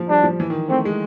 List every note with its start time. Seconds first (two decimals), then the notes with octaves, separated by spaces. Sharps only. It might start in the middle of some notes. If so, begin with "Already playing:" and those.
Already playing: F3
0.09 G3 D4
0.24 F3
0.40 E3
0.50 D#3
0.70 A3 C4
0.85 G#3